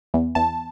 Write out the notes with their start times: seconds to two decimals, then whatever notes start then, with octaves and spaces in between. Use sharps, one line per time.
0.14 E2
0.35 E2 A5